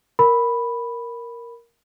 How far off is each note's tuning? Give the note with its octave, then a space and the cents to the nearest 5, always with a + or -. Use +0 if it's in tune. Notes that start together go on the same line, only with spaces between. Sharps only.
A#4 +0 B5 +0